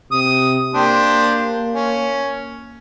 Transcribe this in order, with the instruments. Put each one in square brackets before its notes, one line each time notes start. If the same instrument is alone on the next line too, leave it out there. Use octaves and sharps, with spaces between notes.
[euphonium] C3 [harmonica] D#6
[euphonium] A#3 [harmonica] D4 G4 C5
[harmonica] C#4